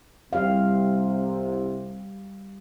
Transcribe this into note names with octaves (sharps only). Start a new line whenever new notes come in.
C2 C3 G3 G4 F5